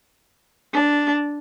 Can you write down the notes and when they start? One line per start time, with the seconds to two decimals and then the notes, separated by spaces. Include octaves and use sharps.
0.74 D4